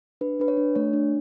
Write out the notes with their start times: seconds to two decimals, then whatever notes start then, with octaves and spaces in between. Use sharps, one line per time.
0.21 D4 B4
0.40 D4 B4
0.48 C#5
0.57 D4
0.75 A3 C#5
0.93 D4